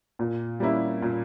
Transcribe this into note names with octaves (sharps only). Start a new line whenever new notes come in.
A#2
G3 A#3 C#4 E4
A#2